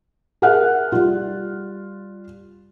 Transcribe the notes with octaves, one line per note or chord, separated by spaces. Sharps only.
G#4 A#4 E5 F#5 F6 F#6
G3 F4